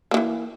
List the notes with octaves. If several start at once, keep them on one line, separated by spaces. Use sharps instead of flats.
D#3 E3 A#3